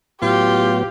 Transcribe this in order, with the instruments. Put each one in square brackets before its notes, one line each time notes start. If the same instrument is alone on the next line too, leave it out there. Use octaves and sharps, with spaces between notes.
[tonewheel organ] A2 F#3 B3 [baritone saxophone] F4 [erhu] G4